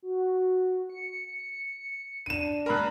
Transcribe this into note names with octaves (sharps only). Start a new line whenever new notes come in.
F#4
C#7
D4 D#7 E7
G2 A#4 A#5 B5 F#6